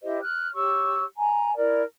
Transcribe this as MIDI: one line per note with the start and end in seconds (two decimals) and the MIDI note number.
0.02 0.17 64
0.02 0.17 67
0.02 0.17 72
0.02 0.17 75
0.22 0.49 89
0.22 0.49 90
0.53 1.02 67
0.53 1.02 73
0.53 1.02 85
0.53 1.02 88
1.17 1.55 80
1.17 1.55 82
1.56 1.81 64
1.56 1.81 70
1.56 1.81 74